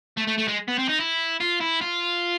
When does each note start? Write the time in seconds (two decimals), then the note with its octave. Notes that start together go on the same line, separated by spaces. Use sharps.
0.17 A3
0.27 A3
0.38 A3
0.48 G#3
0.68 B3
0.79 C4
0.89 D#4
0.99 E4
1.40 F4
1.61 E4
1.81 F4